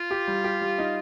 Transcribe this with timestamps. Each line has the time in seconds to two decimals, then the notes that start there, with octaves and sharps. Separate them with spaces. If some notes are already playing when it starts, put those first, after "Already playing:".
Already playing: F4
0.11 G4
0.27 G3
0.44 G4
0.61 G3
0.78 D#4